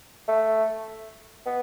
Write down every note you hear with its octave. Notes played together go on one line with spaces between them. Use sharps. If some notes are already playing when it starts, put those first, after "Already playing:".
A3
B3